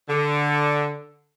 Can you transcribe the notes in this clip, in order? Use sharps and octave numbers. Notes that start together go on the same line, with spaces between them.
D3